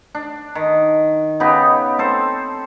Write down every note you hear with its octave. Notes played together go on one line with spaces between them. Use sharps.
D4
D#3
C#3 B3 D#4 G4
C4 A4 C5